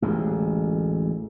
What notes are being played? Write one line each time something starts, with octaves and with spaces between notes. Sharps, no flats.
A1 D2 G#3